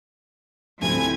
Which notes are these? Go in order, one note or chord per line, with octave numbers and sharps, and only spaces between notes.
D2 F3 G3 C4 E4 G#5 G#6